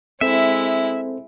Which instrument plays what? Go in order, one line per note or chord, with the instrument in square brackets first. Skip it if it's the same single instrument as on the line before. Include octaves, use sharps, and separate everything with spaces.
[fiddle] G#3 E4 [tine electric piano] C4 A4 C5 [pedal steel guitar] E5